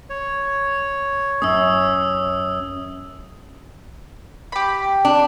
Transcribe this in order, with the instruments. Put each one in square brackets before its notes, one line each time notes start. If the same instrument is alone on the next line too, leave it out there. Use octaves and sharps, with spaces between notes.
[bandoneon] C#5
[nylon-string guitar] F#2 C#4 [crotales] D#6 E6
[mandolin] G4 B5
[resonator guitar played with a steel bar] D4